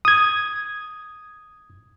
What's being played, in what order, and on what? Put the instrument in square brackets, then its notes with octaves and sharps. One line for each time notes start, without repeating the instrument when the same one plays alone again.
[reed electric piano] D#6 G#6